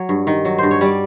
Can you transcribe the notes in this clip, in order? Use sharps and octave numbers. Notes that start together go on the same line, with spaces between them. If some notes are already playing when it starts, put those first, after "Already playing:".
Already playing: F#3 C#5
G2
D#3
F#3
G2 C5
C#5
G3 D5